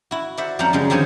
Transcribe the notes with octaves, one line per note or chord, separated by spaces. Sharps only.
E4 F#4
F#4 C5 D5 E5 F#5
F2 G3 C#4 C5 F#5 A#5
F#2 C#3 G3 G#3 C#4
D3 D#3 F3 C4 C#5 G#5